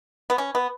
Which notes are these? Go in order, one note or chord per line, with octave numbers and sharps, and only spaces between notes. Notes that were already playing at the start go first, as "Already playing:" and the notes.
B3
C#4
B3